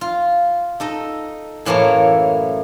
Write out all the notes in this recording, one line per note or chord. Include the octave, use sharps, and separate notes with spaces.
F4
D#4 A4 D#5
F#2 A2 E3 A#3 C#5 A5